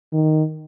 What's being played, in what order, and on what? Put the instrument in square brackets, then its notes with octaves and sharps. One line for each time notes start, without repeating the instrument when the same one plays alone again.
[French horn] D#3